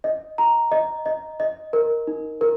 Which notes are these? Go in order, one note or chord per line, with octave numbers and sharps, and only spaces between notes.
D#5
A#5
D#5
D#5
D#5
A#4
D#4
A#4